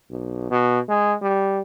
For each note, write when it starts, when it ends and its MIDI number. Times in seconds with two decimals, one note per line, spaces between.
0.11 0.48 35
0.50 0.80 47
0.89 1.14 56
1.22 1.62 55